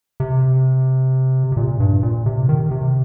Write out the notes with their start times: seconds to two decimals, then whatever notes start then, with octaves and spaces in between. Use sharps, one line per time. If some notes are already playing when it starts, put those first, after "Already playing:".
0.20 C3
1.52 C3
1.57 A#2
1.80 G2
2.03 A#2
2.26 C3
2.49 D#3
2.71 C3